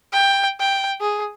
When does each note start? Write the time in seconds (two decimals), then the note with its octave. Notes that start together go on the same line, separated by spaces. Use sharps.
0.13 G5
0.60 G5
1.01 G#4